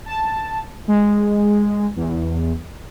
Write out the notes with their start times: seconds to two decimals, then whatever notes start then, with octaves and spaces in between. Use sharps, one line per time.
0.06 A5
0.88 G#3
1.96 E2